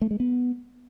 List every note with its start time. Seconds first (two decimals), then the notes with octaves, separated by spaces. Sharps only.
0.02 A3
0.11 G#3
0.20 B3